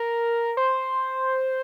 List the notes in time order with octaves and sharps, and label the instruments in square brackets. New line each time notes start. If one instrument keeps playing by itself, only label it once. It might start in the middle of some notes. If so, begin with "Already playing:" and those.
Already playing: [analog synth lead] A#4
C5